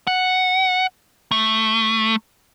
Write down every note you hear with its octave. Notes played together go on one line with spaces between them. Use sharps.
F#5
A3